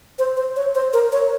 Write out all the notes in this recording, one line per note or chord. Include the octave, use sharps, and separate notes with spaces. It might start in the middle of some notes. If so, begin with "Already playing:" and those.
C5
C5
C#5
C5
A#4
C#5